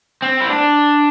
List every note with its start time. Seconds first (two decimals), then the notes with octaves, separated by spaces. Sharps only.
0.22 C4
0.41 E4
0.48 D4